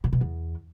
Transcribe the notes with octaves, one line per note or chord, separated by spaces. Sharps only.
A#2
B2
E2